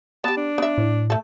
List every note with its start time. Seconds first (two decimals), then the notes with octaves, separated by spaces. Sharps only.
0.24 B3 G4 A5
0.37 D4
0.58 B3 E5
0.78 A2
1.10 A3 A4